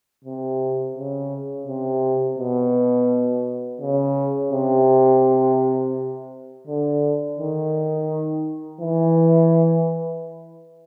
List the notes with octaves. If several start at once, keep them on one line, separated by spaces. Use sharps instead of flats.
C3
C#3
C3
B2
C#3
C3
D3
D#3
E3